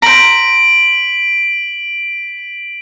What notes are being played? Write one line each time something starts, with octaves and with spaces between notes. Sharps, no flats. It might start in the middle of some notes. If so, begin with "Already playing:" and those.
C5 A#5 B6 D7 F#7